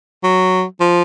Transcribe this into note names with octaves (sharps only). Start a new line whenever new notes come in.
F#3
F3